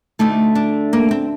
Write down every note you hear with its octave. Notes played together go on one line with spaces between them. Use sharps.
D2 D3 A3 D#4
D4
A#3
C4